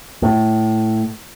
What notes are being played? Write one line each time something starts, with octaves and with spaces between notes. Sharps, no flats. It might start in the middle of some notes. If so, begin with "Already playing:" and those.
A2